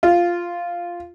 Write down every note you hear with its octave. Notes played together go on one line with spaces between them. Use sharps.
F4